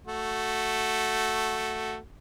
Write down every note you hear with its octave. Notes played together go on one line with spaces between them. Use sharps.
A3 F#4